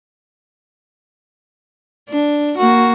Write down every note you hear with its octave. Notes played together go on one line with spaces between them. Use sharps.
D4
A#3 F#4